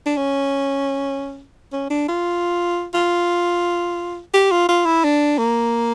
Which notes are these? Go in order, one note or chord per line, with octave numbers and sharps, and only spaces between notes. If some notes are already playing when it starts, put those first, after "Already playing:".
D4
C#4
C#4
D4
F4
F4
G4
F4
F4
E4
D4
A#3